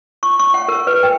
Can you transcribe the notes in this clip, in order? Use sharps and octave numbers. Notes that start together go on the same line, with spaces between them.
C#6
C#6
F#5
A#4
B4
G5